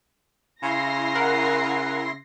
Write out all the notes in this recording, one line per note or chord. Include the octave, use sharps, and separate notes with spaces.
C#3 E4 C6 A#6 C7
A#4 F#5